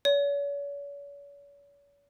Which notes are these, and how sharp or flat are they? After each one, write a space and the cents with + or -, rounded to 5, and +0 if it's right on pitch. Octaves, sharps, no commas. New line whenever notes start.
C#5 +40